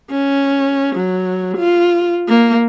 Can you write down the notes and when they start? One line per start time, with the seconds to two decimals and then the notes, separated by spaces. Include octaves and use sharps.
0.10 C#4
0.96 F#3
1.57 F4
2.28 A#3